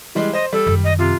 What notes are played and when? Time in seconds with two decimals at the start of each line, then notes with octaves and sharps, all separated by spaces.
0.15 E3 G3 G#3
0.33 C5 D#5
0.53 G3 A4
0.67 F#2 D#3
0.84 D#5
0.99 C3 F4